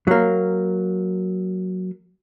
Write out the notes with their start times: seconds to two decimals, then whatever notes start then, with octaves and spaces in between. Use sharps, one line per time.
0.07 F#3 A#3